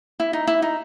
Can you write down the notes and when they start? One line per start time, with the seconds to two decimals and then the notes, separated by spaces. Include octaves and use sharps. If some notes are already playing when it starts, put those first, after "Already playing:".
0.20 E4
0.33 D#4
0.47 E4
0.62 D#4